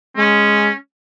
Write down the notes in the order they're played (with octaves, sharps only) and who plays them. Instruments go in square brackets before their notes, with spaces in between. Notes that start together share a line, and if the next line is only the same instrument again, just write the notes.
[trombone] G#3 [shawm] C#4